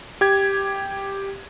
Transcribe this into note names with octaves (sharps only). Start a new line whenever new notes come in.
G4 G#6